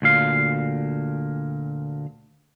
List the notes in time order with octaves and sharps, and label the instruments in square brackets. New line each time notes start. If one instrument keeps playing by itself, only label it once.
[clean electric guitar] D2 A#2 F5